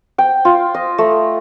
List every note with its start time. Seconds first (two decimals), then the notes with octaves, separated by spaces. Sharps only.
0.18 G5
0.45 F4
0.74 D#5
0.98 A3